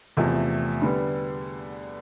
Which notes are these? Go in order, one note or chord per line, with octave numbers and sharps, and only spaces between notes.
E2 C3 F3 A3
D3 G3 B3